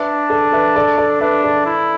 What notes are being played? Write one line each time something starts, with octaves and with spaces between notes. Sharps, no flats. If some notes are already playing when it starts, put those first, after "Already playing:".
Already playing: D4 B4 E5
A4 D5
B4 E5
A4 D5
A4 D5
D4 B4 E5
A4 D5
E4